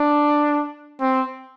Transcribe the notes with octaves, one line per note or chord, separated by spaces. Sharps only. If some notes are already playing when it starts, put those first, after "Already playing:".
Already playing: D4
C4